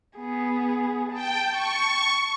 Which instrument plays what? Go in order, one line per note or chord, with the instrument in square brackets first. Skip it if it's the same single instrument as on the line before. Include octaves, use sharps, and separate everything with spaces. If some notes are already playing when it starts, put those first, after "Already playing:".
[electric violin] B3 G#4
[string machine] G5 [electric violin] A5
[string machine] C#6